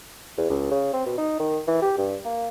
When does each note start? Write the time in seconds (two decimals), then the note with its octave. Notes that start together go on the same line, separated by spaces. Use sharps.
0.37 E2
0.50 C#2
0.71 C#3
0.93 C4
1.06 B2
1.18 D#4
1.39 D#3
1.67 E3
1.82 G4
1.98 G2
2.25 A#3